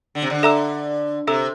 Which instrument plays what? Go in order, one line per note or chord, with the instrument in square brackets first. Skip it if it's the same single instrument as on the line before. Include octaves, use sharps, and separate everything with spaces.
[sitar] D3
C3
D3
[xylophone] A4 E5 A#5 E6
[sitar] C3 [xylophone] A4 E5 A#5 E6